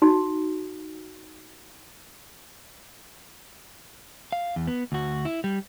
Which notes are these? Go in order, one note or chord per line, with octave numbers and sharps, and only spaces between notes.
D#4 F#4
F5
E2
B3
D2 F#4
E4
G3